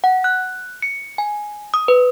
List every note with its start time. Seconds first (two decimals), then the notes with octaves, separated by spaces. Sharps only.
0.04 F#5
0.24 F#6
0.82 C#7
1.18 G#5
1.74 D#6
1.88 B4